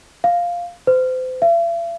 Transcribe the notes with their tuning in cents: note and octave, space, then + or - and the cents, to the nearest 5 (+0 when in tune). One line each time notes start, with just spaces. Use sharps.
F5 +0
C5 -35
E5 +45